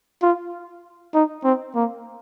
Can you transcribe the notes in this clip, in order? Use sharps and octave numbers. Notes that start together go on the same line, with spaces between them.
F4
D#4
C4
A#3